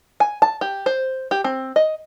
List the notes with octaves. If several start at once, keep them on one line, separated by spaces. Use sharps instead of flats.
G#5
A5
G4
C5
G4
C4
D#5